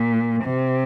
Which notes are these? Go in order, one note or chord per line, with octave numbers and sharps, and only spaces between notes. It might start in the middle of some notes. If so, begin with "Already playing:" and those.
Already playing: A#2
C3